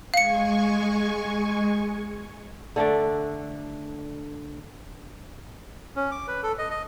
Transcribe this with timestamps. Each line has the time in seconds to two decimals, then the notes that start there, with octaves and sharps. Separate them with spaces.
0.14 G#3 F5 G#5 C#6 C#7
2.76 D3 A3 D4 D5
5.96 C#4
6.11 D6
6.28 B4
6.43 A4
6.58 D#5
6.70 D#5